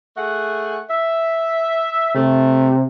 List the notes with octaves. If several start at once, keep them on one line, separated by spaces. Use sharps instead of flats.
A3 G#4 F#5
E5
C3 A3